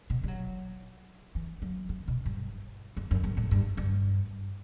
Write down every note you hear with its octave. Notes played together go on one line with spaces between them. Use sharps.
B2
G3
F#3
E3
F#3
D3
B2
G2
F#2
F#2
G2
A2
G2
G2